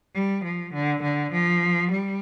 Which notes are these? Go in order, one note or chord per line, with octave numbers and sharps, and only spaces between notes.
G3
F3
D3
D3
F3
G3